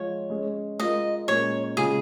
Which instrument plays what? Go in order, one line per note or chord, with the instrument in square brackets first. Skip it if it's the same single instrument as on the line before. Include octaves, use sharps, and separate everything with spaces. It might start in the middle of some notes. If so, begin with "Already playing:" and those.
Already playing: [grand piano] F3 G#3 F4 [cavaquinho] C#5
[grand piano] G#3 C#4 G#4
[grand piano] G#3 F4 A#4 [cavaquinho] D#5
[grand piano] A#2 G#3 C#4 A#4 [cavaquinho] C#5
[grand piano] C#3 G#3 F4 [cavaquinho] G#4